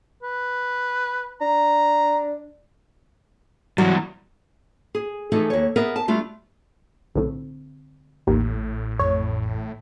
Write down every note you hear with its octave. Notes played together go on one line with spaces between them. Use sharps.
B4
D4 A#5
G2 E3 F#3
G#4
E3 F3 A3 D#4 G#4 A4
D#2 C#5
B3 G#4 A#4 E5
A5
G3 A3 D4 F4
B1 A2 D3 C4
A1 D#2 A2
F2 C#5